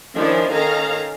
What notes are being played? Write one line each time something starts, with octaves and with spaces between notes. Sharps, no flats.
D#3 F3 C#4 D4 E4
D#3 C#4 A4 F5 A#5